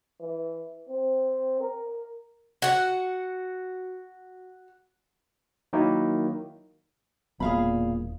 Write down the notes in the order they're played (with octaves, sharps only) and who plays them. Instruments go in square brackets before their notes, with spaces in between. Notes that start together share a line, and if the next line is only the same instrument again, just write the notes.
[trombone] E3
C4
A#4
[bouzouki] F#4 F#5
[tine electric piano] D#3 F#3 A#3 D#4 E4
[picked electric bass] E1 [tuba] A#2 [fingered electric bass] G3 B3 [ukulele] G#4 F5 B5